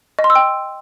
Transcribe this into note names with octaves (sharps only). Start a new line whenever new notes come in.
D#5
C6
E6
G5